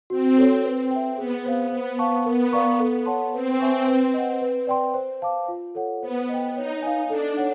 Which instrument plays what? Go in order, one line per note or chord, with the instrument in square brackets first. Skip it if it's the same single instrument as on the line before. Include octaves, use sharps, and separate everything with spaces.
[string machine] C4 [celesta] F#4
[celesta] A4 C#5
B4
E5 G5
[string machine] B3 [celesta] G#4
[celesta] C5 F5
[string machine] B3 [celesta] C5
[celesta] F5 A5 C#6
[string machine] B3 [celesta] A#4
[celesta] D5 F5 A#5 C#6
A4
C#5 F#5 A5 C6
[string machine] C4 [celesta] B4
[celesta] E5 G#5 C#6
B4
D#5 F#5
B4
D5 G5 C6
C5
F5 A5 D6
F4
A4 C#5 F#5
[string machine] B3 [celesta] C5
[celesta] D#5 G5
[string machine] D#4 [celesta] C#5
[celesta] F5 G#5
[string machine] D4 [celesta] A4
[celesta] C#5 F#5